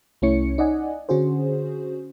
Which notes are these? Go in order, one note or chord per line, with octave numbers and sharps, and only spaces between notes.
C2 A3 C#4 E4 C#5 C#7
D#4 D5 D#5 F#5 G#5
D3 C#4 F#4 G#4 C5